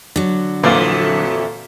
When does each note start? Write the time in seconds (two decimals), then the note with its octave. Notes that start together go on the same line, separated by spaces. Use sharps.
0.16 D3 F#3
0.63 F2 A#2 E3 F#4 A4 D5 F5